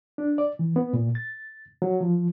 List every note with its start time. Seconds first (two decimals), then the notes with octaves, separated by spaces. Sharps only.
0.18 D4
0.38 D5
0.59 E3
0.76 B3
0.93 A#2
1.15 A6
1.82 F#3
2.01 F3